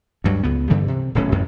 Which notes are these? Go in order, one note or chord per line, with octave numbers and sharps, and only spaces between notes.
D2 G2 F#3
C#2 B3
G2 D3 E3 G3
C3
D#1 B1 A2 C#4
A1 F#2 C3